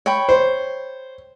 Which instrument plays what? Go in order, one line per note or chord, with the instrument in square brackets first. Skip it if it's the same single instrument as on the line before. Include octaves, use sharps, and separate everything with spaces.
[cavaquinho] C#5 G5 B5
[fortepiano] C5